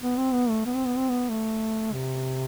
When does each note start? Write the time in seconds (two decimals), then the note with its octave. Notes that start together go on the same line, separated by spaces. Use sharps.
0.01 B3
0.17 C4
0.33 B3
0.49 A3
0.66 B3
0.75 C4
0.86 B3
0.97 C4
1.09 B3
1.29 A3
1.93 C3